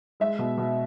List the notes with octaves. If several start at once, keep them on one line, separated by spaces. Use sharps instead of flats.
G#3 E5
B2
B2